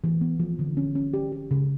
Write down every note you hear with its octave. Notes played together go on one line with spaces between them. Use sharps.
E3
B3
F3
D3
C#4
C#4
G4
G4
C#3